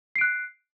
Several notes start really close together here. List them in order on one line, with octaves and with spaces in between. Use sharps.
C7 D7 F#6